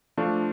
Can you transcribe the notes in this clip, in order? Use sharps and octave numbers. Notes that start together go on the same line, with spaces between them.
F3 A3 D4 F4